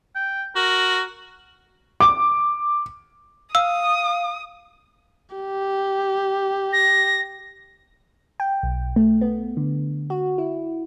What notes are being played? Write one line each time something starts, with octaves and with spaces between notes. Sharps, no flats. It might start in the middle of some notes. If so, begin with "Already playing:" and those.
G5
F#4 A#4
D6
F5 D#6 E6
G4
A#6
G5
B1
A3
B3
D3
F#4
E4